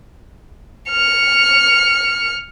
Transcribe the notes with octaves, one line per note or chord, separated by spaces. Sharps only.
F6 C#7